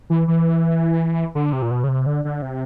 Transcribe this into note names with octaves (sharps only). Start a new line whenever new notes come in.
E3
E3
D3
C3
A#2
B2
C#3
C3
D3
D3
C3